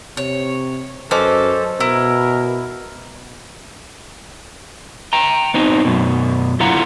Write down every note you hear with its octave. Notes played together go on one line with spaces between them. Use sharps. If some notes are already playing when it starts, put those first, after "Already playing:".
C3 C#5
F#2 C#4 A4 B4 C5 D#5 D6
B2 E4 A#4
G5 A#5
B3 C4 D#4
F#2 B2
D3 E4 F4 F#5 A#5